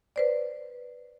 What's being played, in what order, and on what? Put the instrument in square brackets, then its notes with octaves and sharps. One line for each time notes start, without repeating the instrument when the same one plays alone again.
[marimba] B4 C5 D5